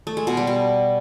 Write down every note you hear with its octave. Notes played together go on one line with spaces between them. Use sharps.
A3
G#3
B2
G3
B2